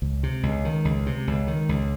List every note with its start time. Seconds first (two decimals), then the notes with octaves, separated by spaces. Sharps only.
0.02 C#2
0.23 C3
0.43 C#2
0.65 D#3
0.85 C#2
1.06 C3
1.27 C#2
1.47 D#3
1.69 C#2